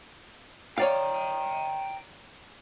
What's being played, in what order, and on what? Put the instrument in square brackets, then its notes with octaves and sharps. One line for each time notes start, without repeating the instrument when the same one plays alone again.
[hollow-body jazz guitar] C#5 D5 F5 [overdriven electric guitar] G5 A#5